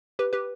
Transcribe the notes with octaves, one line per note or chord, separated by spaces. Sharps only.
G4 B4
G4 B4